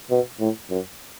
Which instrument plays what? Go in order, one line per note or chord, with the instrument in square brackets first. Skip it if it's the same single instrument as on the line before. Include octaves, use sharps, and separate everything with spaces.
[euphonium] B2
A2
F#2